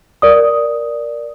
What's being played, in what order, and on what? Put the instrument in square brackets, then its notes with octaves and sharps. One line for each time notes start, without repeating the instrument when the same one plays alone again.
[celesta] A#4 D5 D#6